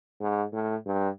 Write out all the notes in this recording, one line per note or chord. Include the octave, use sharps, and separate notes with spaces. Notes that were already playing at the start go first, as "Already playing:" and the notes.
G#2
A2
G2